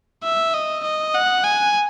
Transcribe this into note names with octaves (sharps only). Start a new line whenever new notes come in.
E5
D#5
D#5
F#5
G#5